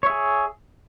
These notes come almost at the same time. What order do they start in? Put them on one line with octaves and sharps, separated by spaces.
C#5 E5 G#4